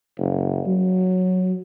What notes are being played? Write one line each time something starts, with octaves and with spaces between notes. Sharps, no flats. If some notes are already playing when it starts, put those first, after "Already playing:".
F#1
F#3